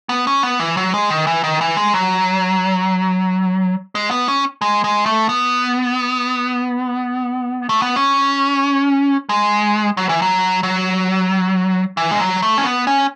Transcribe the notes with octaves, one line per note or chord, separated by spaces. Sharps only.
B3
C#4
B3
E3
F#3
G#3
D#3
E3
D#3
E3
G#3
F#3
G#3
B3
C#4
G#3
G#3
A3
B3
A3
B3
C#4
G#3
F#3
E3
F#3
F#3
E3
G#3
F#3
A3
C#4
B3
C#4